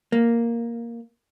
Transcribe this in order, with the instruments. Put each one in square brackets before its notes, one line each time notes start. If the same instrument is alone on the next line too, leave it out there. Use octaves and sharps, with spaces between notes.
[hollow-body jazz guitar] A#3